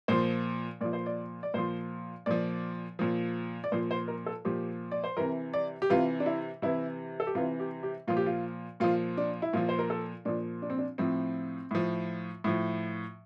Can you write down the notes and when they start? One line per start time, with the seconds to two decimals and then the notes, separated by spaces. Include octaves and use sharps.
0.08 A#2 F3 C5
0.81 A#2 F3 D5
0.93 C5
1.06 D5
1.43 D5
1.54 A#2 F3 C5
2.26 A#2 F3 D5
2.99 A#2 F3
3.64 D5
3.72 A#2 F3 C5
3.91 C5
4.08 A#4
4.26 A4
4.45 A#2 F3 G4
4.91 D5
5.04 C5
5.17 C3 E3 A#4
5.54 D5
5.82 G4
5.90 C3 E3 F4
6.20 D4
6.26 E4
6.62 C3 E3 E4
7.20 A4
7.27 G4
7.35 C3 E3 F4
7.60 G4
7.83 G4
8.08 A#2 F3 F4
8.17 G4
8.26 F4
8.80 A#2 F3 F4
9.17 D4
9.42 E4
9.53 A#2 F3 F4
9.69 C5
9.79 A#4
9.90 A4
10.25 A#2 F3 D4
10.62 D4
10.70 C4
10.78 D4
10.98 A2 F3 C4
11.71 A2 F3
12.44 A2 F3